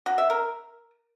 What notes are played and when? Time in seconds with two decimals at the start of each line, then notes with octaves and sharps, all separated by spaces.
0.06 F#4
0.18 E5
0.30 A#4